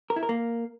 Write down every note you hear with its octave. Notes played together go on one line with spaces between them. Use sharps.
A#4
E4
A#4
A#3